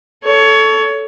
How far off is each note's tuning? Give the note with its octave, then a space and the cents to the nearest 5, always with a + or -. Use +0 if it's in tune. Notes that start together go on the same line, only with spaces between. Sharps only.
A4 +0 C#5 +20